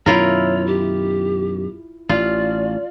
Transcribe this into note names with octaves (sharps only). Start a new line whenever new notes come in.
F#2 B2 D#3 E4 F4 A#4 C#5
G4
A1 F4 D5